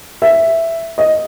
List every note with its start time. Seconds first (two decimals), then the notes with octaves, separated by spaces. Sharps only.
0.22 E5
0.98 D#5